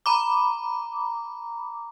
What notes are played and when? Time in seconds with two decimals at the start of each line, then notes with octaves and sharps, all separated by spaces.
0.06 A#5 B5 D6